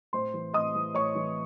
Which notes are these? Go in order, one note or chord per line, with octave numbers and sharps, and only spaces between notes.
A2 C5 C6
E3
A2 D#5 D#6
E3
A2 C#5 C#6
E3